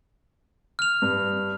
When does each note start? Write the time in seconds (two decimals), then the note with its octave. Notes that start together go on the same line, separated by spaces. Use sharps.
0.79 F6 F7
1.02 G2